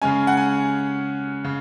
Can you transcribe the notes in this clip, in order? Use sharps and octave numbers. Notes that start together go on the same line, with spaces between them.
C#3 G#3 C#4 G#5
F#5
G#5
C#3